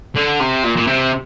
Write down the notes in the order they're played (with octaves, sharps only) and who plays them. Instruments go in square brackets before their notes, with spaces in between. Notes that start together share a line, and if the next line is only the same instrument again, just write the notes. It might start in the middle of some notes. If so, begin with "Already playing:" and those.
[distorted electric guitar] D3
C3
A#2
A#2
C3